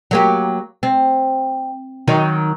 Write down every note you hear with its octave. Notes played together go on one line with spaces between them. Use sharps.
F#3 A#3 G4
C4
D#3 F#3 D#4